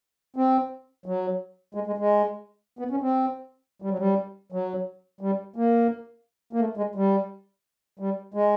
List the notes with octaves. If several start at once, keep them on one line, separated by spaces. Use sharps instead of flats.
C4
F#3
G#3
G#3
G#3
B3
C#4
C4
G3
F#3
G3
F#3
G3
A#3
A#3
A3
G#3
G3
G3
G#3